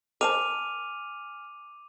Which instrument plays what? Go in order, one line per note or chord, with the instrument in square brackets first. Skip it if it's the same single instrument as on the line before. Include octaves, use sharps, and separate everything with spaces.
[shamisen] A#4 C5 A5 [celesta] G#5 F6 [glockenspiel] D6 D#7 F7